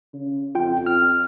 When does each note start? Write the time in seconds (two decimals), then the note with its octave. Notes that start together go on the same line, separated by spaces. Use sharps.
0.13 C#3
0.55 F2 F4 G5
0.86 F6